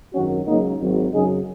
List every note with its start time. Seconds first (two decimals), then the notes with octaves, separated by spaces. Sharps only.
0.14 G#1 F#2 D#3 F#3 C#4 F#4
0.47 C#2 C#3 F#3 A#3 D#4
0.81 G#1 G#2 F#3
1.13 F#2 C#3 F#3 D#4 G#4